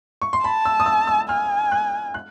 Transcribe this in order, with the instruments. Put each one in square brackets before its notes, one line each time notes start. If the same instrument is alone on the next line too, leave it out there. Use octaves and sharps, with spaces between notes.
[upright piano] C#6
C6
[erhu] A5 [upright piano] B5
[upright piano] E6
D#6
E6
E6
[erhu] G#5 [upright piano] F6
[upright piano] F#6
F#6